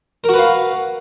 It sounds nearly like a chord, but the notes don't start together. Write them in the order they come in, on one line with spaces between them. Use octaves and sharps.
A#4 F#4 B4 F5